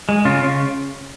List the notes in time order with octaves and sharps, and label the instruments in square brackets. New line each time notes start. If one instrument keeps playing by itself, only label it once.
[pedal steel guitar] G#3
C#3 F4
C#3